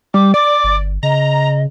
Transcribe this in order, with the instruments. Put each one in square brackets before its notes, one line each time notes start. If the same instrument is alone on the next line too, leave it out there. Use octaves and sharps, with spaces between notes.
[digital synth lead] G3 [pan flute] D6
[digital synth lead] D5 [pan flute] D6
[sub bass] G1
[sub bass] C#3 [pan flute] D#5 [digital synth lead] A#5